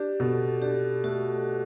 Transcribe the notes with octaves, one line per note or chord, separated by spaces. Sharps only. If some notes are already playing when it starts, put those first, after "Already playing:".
Already playing: D4 G4
B2 A4
D4 G4
A3 F#4